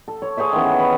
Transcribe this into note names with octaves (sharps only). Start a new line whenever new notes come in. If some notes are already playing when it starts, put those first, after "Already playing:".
A4
C#5
G#4 C5 C#5 E5
D#3 E3 B3 C#4
G#4
B5